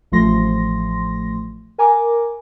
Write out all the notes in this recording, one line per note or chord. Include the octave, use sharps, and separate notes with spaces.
A1 F3 A3 C6 A#6
A#4 G#5 A#5 D6